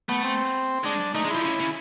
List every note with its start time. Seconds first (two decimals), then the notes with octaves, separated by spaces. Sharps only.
0.09 A3 B3
0.24 C4
0.84 G#3 D4
1.15 A3 D#4
1.25 G#3
1.30 E4
1.35 F3
1.46 C#3
1.60 C#3